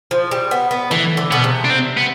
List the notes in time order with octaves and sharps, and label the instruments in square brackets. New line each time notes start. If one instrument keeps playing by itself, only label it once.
[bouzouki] F3
G3
B3
B3
[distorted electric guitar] E3 [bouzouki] A3
[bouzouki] D3
[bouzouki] B2 [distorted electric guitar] B3
[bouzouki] C3
[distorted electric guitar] D4
C4
B3